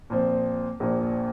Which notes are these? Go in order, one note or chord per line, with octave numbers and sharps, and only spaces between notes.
A#2 F3 C4
A#1 A#2 F3